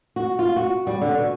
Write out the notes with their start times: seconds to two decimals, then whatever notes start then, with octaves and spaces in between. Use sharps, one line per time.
0.16 F#4
0.39 F4
0.56 F#4
0.87 G3
1.01 D3
1.17 B2